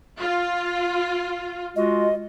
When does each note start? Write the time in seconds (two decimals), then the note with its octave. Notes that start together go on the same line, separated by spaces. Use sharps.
0.17 F4
1.76 G#3 F4 F#4 D#5